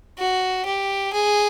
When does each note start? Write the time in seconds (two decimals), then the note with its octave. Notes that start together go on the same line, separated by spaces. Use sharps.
0.18 F#4
0.66 G4
1.13 G#4